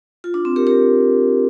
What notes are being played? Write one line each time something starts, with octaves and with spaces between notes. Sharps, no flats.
F4
D4
C4
G4 A#4
G4 A#4